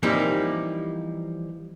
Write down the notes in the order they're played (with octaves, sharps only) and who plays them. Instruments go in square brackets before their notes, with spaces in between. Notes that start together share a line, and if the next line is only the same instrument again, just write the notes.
[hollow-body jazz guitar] E3 F3 G3 A#3 C4 D#4